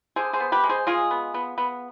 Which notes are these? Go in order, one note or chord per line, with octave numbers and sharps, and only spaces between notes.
D3 G#4 C5
G#4 C5
B3
G4 B4
G#3
G#4 C5
G#3 F4 G#4
B3
B3
B3